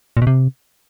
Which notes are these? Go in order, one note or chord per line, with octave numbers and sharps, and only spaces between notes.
A#2
B2
C3